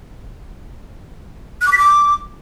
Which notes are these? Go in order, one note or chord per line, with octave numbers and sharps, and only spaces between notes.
F#6
D6
B6
D6